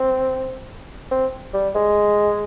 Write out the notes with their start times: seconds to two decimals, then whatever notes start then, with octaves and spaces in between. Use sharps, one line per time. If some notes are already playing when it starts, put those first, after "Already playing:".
Already playing: C4
1.11 C4
1.54 G3
1.75 G#3